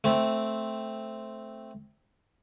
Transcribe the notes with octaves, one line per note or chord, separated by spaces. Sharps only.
A3 C4